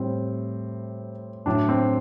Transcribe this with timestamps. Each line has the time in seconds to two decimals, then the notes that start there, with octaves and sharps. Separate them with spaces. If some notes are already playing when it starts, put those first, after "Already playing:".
Already playing: A2 G3 C4
1.46 A2 F#3 D4
1.69 C4